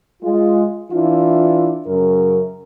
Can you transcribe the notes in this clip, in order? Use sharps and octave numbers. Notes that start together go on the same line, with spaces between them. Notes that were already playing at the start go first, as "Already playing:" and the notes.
G#3 F4
E3 D4 E4 F4
F#2 C#3 A#4